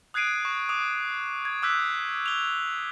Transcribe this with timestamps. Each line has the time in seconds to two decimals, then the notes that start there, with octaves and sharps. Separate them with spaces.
0.14 D#6 F#6 G#6 C7 D7 D#7
0.45 C#6
0.69 D6 D#6
1.45 G#6
1.62 D6 E6 F#6 G6 B6
2.26 F7 G7